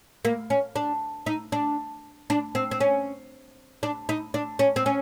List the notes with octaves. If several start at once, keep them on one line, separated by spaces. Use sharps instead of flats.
A#3
C#4
D4
D#4
D4
D4
C4
C4
C#4
D4
D#4
D4
C#4
C4
C#4